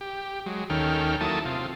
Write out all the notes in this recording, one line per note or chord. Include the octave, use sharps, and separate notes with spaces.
G4
F#3 G#3
D#2 D#3 C#4 A4 G5 F6
F#3 A#3 E4 A4 A5 D#6
C3 F4